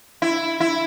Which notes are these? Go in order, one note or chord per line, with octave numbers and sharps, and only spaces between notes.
E4
E4